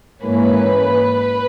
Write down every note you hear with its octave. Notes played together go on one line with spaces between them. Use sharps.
G#2 E3 A#3 C#4 B4